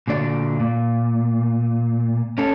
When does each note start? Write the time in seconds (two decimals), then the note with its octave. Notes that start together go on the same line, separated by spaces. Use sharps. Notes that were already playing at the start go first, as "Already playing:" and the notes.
0.08 A#2 D3 F#4 D5
0.60 A#2
2.38 C#4 A4